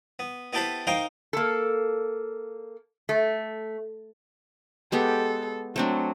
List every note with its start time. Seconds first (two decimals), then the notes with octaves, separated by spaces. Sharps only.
0.19 B3
0.53 B3 E4 G4 A4 B4 C5
0.87 D#4 A#4 C5 F5 G5 C6
1.33 A#3 A4
3.09 A3
4.92 G#3 B3 G4 A4
5.76 F#3 A3 C4 D4